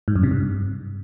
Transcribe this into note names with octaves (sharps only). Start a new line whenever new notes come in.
G#2
F#2
C3
G2